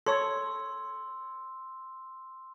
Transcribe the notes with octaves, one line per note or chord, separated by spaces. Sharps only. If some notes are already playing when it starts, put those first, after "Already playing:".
A4 C#5 C6 E6